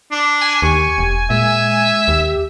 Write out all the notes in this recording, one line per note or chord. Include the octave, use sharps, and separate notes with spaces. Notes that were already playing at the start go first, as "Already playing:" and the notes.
D4
G#5
D#2 G4 C#6
E1
A#2 G#3 E5
D#2 G4